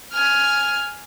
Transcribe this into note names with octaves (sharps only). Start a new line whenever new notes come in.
G#5 F6